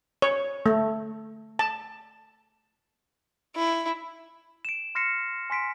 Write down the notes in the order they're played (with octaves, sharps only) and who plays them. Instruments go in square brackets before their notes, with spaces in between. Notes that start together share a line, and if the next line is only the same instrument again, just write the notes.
[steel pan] C#5
A3
A5
[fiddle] E4
[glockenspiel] D7 E7
C6 F6 A#6 C7 C#7 E7
G#5 C6 B6 D7